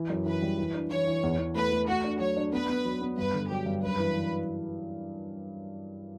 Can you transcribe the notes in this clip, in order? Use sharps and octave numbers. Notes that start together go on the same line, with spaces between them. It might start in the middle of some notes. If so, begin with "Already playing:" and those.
Already playing: E3
F#2
E3 B4
G3
E3
D4
E3 C#5
E3
E2
E2
A3 B4
A3
A3 F#4
D4
F#3 C#5
D4
B3 B4
B3
F#3
B3
G2 B4
D3
F#3 G4
G2
F#2 B4
E3
E3